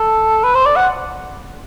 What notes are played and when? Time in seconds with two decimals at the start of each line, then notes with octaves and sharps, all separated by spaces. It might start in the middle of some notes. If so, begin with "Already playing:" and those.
Already playing: A4
0.44 B4
0.55 C5
0.66 D5
0.76 F#5